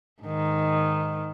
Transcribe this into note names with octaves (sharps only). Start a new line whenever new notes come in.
G#2 D#3